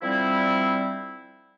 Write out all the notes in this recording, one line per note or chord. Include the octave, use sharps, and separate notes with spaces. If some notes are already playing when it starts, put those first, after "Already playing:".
D3 F3 G3 C4 E4